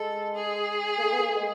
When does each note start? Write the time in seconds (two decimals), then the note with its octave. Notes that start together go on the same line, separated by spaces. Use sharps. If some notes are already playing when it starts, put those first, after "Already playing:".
Already playing: G#3 A4
0.35 G#4
0.98 A#3
1.02 A3
1.13 B3
1.21 A#3
1.29 A3
1.37 G#3